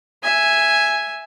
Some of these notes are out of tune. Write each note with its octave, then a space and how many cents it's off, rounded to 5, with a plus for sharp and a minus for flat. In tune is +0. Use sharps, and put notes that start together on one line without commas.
E5 +0 G#5 +0